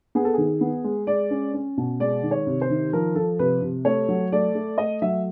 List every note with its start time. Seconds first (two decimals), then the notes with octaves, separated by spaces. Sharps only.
0.15 B3 G#4
0.25 A4
0.34 D#3 G#4
0.61 B3
0.84 G#3
1.07 G#3 D5
1.30 C#4
1.54 C#4
1.77 B2
2.00 G#3 D5
2.23 D#3
2.31 C#5
2.47 C3
2.61 C5
2.70 D#3
2.93 F3 A#4
3.15 F3 A4
3.39 C3 B4
3.62 C3
3.85 A3 C#5
4.09 F#3
4.32 A3 D5
4.55 A3
4.78 A3 D#5
5.02 F#3 E5